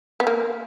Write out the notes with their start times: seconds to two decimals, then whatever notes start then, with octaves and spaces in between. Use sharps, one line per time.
0.20 B3
0.27 A#3